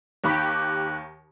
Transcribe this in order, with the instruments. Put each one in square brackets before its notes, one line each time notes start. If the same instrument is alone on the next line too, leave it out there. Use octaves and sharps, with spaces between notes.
[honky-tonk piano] D#2 D#3 B5 [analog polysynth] G4 [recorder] F#6